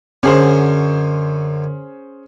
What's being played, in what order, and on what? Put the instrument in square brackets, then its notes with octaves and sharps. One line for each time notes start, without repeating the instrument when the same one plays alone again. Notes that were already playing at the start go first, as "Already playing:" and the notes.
[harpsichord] F#2 D3 F#3 [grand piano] C#4 G#4 C5